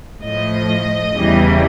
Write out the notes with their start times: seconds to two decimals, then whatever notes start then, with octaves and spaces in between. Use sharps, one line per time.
0.22 A2 F3 D#5
1.14 E2 C#3 E3 G3